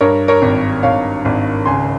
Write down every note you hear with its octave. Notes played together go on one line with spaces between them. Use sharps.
G2 A#4 C#5
A#4 C#5
G#1
G#1 C#5 F5
G#1
C#2 G#5 C6